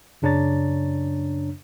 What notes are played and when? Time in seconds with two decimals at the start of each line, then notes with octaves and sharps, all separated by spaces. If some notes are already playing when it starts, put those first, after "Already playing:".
0.22 F#2 C#3 D4 C#5 A#5 A6